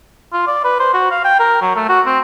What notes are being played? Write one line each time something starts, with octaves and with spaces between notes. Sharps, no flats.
F4
D5
B4
C5
F#4
F5
G5
A#4
F#3
A3
F#4
C4